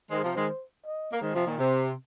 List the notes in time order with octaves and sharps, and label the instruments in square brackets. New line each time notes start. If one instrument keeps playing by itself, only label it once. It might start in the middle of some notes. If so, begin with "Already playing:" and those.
[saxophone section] D#3 G#3 [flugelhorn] C5
[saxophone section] C3 F3
D#3 G#3
[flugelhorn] D#5
[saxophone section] A#3
[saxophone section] D#3 G#3 [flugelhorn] C5
[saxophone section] C3 F3
A#2 D#3
[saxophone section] C3 [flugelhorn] C5